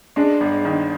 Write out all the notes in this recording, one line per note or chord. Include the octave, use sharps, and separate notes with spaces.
G#3 D4
G1
D#3